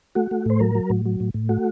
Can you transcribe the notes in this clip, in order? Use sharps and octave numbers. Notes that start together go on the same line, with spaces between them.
A3 F#4
A3
A2 C5
F#3 A#4
F#3
A2
F#3
A2
A2
A3 F#4